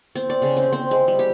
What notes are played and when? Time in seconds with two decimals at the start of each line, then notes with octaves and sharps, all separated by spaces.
0.15 C4
0.30 D5
0.42 C#3
0.57 C4
0.73 C4
0.91 G#3
1.08 G3
1.19 G4